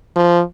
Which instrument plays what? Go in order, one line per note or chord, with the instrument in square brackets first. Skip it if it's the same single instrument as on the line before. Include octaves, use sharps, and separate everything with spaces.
[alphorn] F3